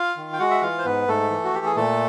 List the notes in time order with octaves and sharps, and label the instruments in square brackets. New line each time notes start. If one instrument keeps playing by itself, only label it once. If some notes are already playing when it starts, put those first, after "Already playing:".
Already playing: [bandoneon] F4 F5
D#3
G5
G#3 F#4 F#5
E5
E3 F4 F5
C5
G#2 B3 B4
G#2 A3 A4
E3
F#4
E3 G4
G#4
A#2 A3 A4